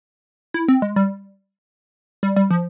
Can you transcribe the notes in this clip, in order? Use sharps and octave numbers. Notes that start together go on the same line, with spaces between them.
E4
C4
G#3
G3
G3
G3
F3